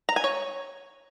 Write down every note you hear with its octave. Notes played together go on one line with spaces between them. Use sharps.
A#5
G#5
C#5